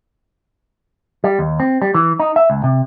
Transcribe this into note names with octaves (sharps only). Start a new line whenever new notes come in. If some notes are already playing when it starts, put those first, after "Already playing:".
G3
D#2
C4
G3
E3
D#4
E5
C#2
C3